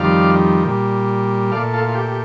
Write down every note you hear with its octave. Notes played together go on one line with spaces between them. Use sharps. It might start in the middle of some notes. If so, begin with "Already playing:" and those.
Already playing: F2 D#3 G3 D5 F5
A#2 G3
A#2 A3 D5 F5
F4 A4
F4
G4
G4